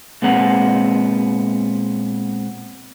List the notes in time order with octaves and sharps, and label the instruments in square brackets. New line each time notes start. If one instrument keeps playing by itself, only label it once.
[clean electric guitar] A#2 G#3 B3 C4 F#5 A#5